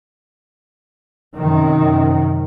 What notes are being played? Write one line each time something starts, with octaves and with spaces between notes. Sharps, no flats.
F#2 C3 D#3